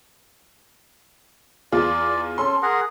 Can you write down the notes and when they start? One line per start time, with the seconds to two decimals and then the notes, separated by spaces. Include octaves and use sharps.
1.72 E2 F4 G#4 D5
2.38 C#4 A4 C6
2.62 G#4 A#4 F#5